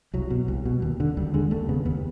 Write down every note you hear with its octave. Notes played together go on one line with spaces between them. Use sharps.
C2 F#3
B2
C2
B2
D#2
D3
D#2 G3
D3 G#3
D#2 A3
C#3 B3
D#2 B3